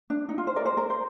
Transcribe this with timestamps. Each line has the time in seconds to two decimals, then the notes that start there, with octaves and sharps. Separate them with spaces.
0.10 D4
0.29 D#4
0.38 F4
0.47 C5
0.56 A#4 D5
0.66 C5
0.77 A#4
0.90 C5